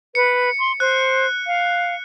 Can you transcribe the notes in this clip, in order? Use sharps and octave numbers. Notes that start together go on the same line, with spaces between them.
B4 C#7
C6
C5 F#6
F5